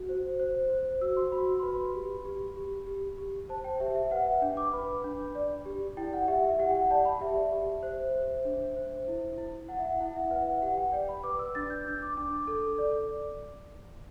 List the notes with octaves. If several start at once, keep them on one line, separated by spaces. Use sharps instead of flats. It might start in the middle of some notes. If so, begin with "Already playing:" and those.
Already playing: F#4
C5
C5
C5
F#4 E6
C6
F#4 B5
C6
B4 B5
G4
G4
G4
G4
G4
C5 A5
G5
G4 E5
E5
B4 F#5
E5
D4 G5
D6
B4 B5
D4
D5
G4
E4 G5
F#5
G4 E5
E5
G4 F#5
G5
F#5
D5 A5
B5
G4 E5
G4
C5
C5
D4
C5
E4
E4
E4 F#5
E5
F#5
E4 F#5
E5
B4 F#5
E5
G4 F#5
G5
D5 G5
B5
B4 D6
E6
D4 A6
G6
D4
D6
D4 D6
A4
D5